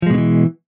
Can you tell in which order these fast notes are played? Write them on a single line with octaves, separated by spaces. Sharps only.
F3 G#3 B2 D3 E3